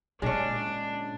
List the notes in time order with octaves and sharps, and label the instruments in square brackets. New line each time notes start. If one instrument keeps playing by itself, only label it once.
[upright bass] A#2 D3 [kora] G#3 C#4 [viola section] D4